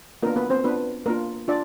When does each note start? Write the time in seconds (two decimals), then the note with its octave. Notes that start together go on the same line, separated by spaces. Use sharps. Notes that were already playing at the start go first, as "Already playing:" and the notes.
0.23 A#3 B3 D4 F4 A#4
0.36 B3 B4
0.50 C4 C5
0.64 B3 D4 F4 B4
1.06 A#3 B3 D4 F4 A#4
1.48 D4 F4 D5